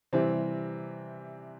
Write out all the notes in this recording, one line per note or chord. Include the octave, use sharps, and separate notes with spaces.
C3 E3 G3 C4